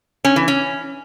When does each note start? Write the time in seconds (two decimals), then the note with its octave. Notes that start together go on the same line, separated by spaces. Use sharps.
0.25 C#4
0.36 E3
0.48 C#4